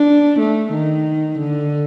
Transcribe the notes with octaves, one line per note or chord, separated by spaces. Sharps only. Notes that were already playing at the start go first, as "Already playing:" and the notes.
Already playing: D4
A3
D#3
D3